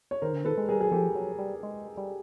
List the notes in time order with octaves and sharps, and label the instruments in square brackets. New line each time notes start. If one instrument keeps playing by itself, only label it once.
[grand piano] C#5
[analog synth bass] D#3 [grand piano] A#4 C5
[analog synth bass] D3
[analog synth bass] D#3 [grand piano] A4 B4
[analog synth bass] G#3
[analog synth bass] G3 [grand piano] G#4 A#4
[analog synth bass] F#3 [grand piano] G#4
[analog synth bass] F3 [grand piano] G4 A4
[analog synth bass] F#3
G3
G#3
G3